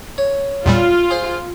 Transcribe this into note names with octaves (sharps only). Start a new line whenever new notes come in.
C#5
E2 A#2 G3 F4
G#4 C5 C6